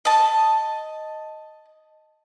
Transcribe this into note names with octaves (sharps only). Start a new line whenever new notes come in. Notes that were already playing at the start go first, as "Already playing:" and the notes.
D#5 A5